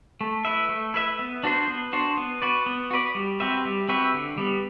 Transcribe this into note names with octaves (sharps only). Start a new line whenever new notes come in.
A3
E4 B4 E5
A3
E4 B4 E5
B3
D4 F#4 C5
B3
D4 F#4 C5
B3
F#4 B4 D5
B3
F#4 B4 D5
G3
C4 F#4 B4 E5
G3
C4 F#4 B4 E5
D3
G3 B3